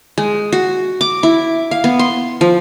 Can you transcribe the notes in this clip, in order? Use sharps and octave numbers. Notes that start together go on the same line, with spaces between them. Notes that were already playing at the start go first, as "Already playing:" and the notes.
G#3
F#4
D6
E4
F5
B3
C6
F3